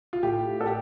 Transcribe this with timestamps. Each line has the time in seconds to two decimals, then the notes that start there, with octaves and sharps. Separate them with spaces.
0.13 F4
0.23 A2 G4
0.61 A4
0.66 G4